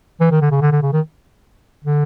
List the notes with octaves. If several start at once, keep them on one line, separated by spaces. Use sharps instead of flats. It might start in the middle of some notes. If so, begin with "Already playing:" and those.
E3
D#3
D3
C#3
D3
D3
C#3
D#3
D3